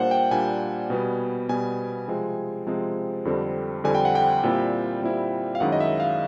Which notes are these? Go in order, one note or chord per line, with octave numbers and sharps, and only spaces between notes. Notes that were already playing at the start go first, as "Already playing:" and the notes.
Already playing: A#2 G3 A#3 D4 C5 F#5
G5
A#2 G3 A#3 D4 G#5
B2 G3 B3
B2 G3 B3 G#5
C3 F3 G#3 C4
C3 F3 G#3 C4
F2 D3 G3 C4
F2 D3 G3 C4 G#5
G5
F#5
G5
A#2 G3 C4 E4
A#2 G3 C4 E4
F5
F#2 D#3 G#3 C#4 E4 F#5
D#5
E5
F5